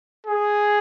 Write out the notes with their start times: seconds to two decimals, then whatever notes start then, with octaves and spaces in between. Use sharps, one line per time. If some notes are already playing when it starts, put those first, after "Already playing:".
0.26 G#4